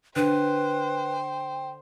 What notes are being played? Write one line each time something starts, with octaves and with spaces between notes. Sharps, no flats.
D3 B4 C5 G5